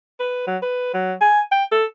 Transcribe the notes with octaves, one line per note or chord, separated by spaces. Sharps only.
B4
F#3
B4
F#3
G#5
G5
A4